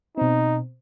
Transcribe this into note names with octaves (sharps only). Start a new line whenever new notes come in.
B2 C4 D#4